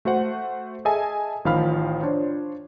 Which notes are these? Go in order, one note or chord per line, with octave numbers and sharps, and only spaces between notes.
A3 F#4 C5 F#5
G#4 A4 D#5 E5 G#5 A5
A1 D#3 F3 F5 B5 F6
D4 F4 C5 C#5